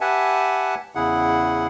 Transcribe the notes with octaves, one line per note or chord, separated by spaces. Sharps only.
G4 B4 E5 F#5 G#5 A5
E2 C#3 E4 G#4 F#5